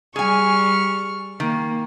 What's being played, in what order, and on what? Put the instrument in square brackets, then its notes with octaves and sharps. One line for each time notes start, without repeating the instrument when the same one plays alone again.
[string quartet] G3 C#6 F6 [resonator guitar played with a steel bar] G#4 G#5
[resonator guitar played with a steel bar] D#3 [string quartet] A#3